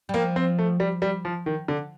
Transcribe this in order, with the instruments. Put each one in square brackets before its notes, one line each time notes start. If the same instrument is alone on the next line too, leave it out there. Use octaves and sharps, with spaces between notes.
[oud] G3
[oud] F3 [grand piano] A#3
[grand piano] C4
A3
G3
G3
F3
D#3
D3